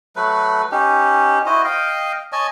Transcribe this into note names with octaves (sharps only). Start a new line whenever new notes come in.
F#3 A3 B4
C#4 D#4 G4
E4 F#4 C5 D#5
D#5 F5 G5
C#5 D#5 G#5 A5